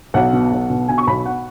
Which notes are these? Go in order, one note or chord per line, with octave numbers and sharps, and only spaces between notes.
B1 F#5
B2
B1
B2
B2 G#5
C#6
B1 B5
F#5